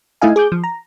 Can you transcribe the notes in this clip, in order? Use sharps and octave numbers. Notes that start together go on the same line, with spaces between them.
A3 D#4 E4 D#5 F5 G#5
G#4 D6 G6
F3
A#5